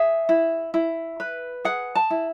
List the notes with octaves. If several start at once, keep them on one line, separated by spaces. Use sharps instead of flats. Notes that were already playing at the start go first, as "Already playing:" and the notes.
Already playing: G#4 E5
E4
E4
B4
G#4 F#5
A5
E4